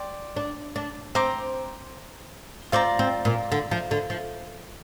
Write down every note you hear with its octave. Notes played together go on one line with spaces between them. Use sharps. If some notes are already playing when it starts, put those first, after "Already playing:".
Already playing: D5 G5 C6
D4
D4
C4 C5 A#5 D6
C4 F4 D5 A#5
C4
A#2
D3
F3
D3
F3